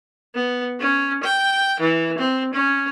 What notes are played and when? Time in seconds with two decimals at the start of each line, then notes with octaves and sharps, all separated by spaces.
0.35 B3
0.81 C#4
1.24 G5
1.80 E3
2.18 C4
2.54 C#4